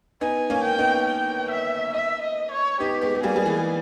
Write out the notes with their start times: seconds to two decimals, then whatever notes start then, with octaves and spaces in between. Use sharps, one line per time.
0.21 B3 D#4 G#5
0.50 A#3 C#4
0.64 G5
0.79 B3 D#4
1.07 G5
1.51 E5
1.94 E5
2.22 D#5
2.51 C#5
2.80 B3 D#4 G4
3.01 G#3 B3
3.15 B3
3.23 G3 A#3 G#4
3.36 G3
3.45 E3 G#3